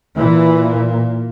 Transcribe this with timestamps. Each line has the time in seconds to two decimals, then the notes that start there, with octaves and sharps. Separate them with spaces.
0.16 A#2 E3